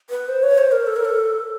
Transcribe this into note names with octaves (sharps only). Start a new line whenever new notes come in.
B4
C5
C#5
C5
A#4
A4
A#4
A4